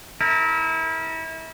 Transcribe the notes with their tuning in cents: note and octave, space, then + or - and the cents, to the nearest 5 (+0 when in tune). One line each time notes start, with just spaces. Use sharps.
E4 -30 A#4 -20